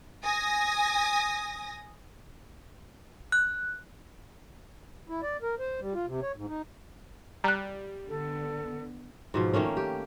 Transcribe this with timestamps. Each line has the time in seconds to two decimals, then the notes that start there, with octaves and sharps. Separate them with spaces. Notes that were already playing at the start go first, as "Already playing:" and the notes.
0.23 G#5 D#6 A#6
3.32 F#6
5.09 E4
5.23 D5
5.42 A#4
5.59 C5
5.80 G3
5.94 F4
6.07 C3
6.22 C#5
6.36 G#2
6.48 D#4
7.44 G3 A#5 F#6
8.09 D3 B3 A4
9.34 G#2 B2 F3
9.53 D#3 A3 A#3 C#4
9.77 G4